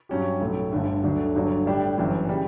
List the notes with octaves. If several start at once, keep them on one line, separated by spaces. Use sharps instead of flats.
G2 F#3 C#4 G4
B1 A2 F#3 A3
G1 G2 D3 A3
D2 D3 F#3 A3 D4
G1 G2 D3 F#3
A2 G3 D4 G4
G1 F#2 E3
C#3 G3